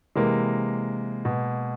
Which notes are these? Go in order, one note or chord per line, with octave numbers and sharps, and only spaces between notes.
C3 E3 G#3 A#3
B2